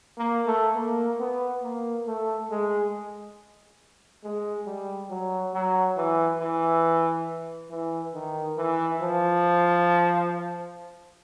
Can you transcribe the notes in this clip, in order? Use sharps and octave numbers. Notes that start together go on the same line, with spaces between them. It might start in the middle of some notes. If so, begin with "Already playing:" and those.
A#3
A3
A#3
B3
A#3
A3
G#3
G#3
G3
F#3
F#3
E3
E3
E3
D#3
E3
F3